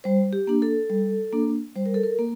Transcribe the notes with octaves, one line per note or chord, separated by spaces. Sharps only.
G3 C5
G4
A#3 D4
A4
G3
A#3 D4
G3 C5
A#4
A4
A#4
A#3